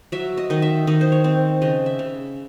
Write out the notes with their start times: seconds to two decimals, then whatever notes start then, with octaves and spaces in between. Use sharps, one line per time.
0.12 F#3 E5
0.37 D#5
0.50 D#3 D#5
0.62 E5
0.87 D#3 D#5
1.01 C5
1.12 C#5
1.24 C4
1.62 C#3 D#5
1.86 E5
1.99 C#3